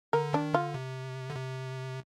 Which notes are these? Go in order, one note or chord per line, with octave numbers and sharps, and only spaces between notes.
D3 A#4
D#3 D4
D3 F4
C3
D3
C3